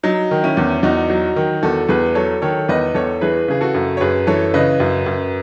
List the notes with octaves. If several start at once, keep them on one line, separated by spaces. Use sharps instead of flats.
F#3 D#4
D#3
C#4 E4
E2
E2 D#4 F#4
F#3
D#3
E2 F#4 A4
E2 G#4 B4
F#3 A4 C#5
D#3 A4 C#5
E2 B4 D#5
E2 A4 C#5
E3 G#4 B4
C#3 G#4
F#4 A4
F#2
C#5
F#2 G#4 B4
E3 A4 C#5
C#3 B4 D#5
F#2
F#2